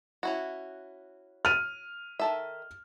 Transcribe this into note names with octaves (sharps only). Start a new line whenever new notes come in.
C#4 E4 F#4
F6 D#7
D#3 A4 E5